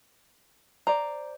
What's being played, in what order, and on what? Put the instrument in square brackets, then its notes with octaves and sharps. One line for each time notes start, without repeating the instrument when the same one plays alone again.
[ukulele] C5 D5 [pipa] A#5